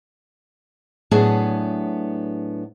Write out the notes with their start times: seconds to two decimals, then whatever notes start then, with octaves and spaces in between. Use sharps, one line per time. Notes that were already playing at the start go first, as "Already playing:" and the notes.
1.11 A2 F#3 B3 D4 G#4 A5